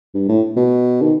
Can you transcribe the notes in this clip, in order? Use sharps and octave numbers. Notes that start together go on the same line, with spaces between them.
G2
A2
B2
D#3